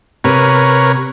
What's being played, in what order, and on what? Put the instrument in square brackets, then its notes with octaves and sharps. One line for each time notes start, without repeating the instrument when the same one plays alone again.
[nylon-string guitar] C3 [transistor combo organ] A#4 B4 C#5